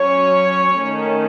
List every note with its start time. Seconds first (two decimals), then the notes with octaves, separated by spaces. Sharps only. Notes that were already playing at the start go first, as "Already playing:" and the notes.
Already playing: F#3 C#4 C#5
0.76 D#3 A3 C#4